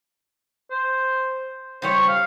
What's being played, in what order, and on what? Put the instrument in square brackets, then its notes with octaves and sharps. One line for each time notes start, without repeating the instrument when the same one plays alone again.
[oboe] C5
[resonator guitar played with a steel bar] C#3 G3 C#5 [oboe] C5
[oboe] F5